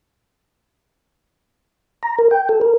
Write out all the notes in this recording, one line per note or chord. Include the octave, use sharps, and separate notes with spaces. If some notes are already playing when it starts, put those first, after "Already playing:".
A#5
A#4
G5
A4
A#4